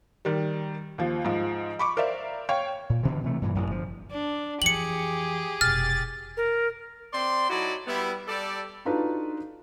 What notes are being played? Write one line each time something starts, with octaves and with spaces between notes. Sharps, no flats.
D#3 G3
D#2 F3
G#2 F3
B5 C#6 D6
A#4 C5 D5 E5 F5
C#5 F5 G5 C#6
A#2
G2 B2 D3 E3
C3 E3 A3
G2 A#2 E3
A1 F#2
G1 F3
D4
F2 E3 G4 G#4 C#7 F#7
F1 B2 F6 A6
A#4
C4 D5 C6
F#3 D#4 E4 F#4 A4 D5
G3 B3 E4
G3 A4 D5
D4 D#4 F4 F#4 A4 B4